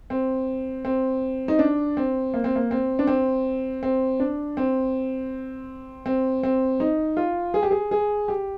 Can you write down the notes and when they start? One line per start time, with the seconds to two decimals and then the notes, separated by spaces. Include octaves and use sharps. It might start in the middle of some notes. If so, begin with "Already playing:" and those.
0.10 C4
0.85 C4
1.48 D#4
1.59 D4
1.97 C4
2.34 A#3
2.44 C4
2.56 A#3
2.71 C4
2.99 D4
3.07 C4
3.83 C4
4.20 D4
4.57 C4
6.06 C4
6.43 C4
6.80 D#4
7.17 F4
7.54 G#4
7.63 G4
7.71 G#4
7.91 G#4
8.28 G4